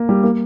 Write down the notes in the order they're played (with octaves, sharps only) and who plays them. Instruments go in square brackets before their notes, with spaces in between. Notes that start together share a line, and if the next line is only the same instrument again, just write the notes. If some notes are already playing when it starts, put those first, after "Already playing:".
Already playing: [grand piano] A#3
G3
A#3